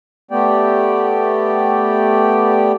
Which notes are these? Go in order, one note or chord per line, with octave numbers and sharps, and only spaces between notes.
A3 B3 G4 D5 G5